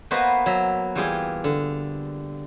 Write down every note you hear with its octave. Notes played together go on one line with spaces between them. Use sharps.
A#3 B3 F#4 B4 C5 D#5
F#3 E5
E3 G3 F4 G4 G#4
D3